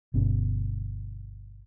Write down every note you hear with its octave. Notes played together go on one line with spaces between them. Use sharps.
G1 B2 C#4